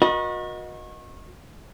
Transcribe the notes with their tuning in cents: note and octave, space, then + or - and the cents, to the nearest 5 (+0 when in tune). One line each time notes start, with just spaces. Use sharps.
F#4 -30 A#4 +45 D#5 +0